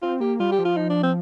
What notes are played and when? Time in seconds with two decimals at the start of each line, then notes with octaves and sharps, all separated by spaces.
0.02 C4 F4
0.20 A#3 G4
0.40 G3 F4
0.52 G4
0.59 F3
0.65 F4
0.77 D#4
0.90 D4
1.03 C4